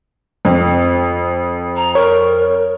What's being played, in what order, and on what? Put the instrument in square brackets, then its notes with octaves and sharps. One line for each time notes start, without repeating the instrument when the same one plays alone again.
[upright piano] F2
[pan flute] A#5
[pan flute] A#4 [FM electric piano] C#5